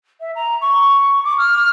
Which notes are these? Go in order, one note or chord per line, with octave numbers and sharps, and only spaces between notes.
E5
A#5
C#6
D6
F6